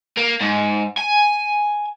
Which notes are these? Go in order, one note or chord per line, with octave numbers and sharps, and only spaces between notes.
A#3
G#2
G#5